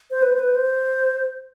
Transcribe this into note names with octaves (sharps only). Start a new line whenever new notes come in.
C5
B4
C5
B4
C5